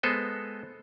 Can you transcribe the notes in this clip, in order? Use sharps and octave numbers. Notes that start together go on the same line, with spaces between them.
G#3 B3 A4 C5 D#5